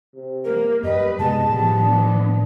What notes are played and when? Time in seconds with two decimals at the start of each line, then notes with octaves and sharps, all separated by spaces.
0.15 C3
0.45 A#3 A#4
0.83 F#2 G3 B4 D#5
1.19 C3 G#3 B3 D#4 A5
1.49 A2 D#3 F3 G3 B3
1.82 D4